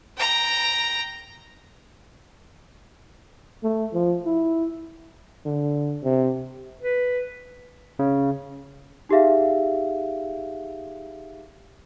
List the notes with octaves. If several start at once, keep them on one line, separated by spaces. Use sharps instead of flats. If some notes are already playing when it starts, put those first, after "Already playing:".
G5 A#5
A3
F3
E4
D3
C3
B4
C#3
D#4 G4 G#4 E5 F5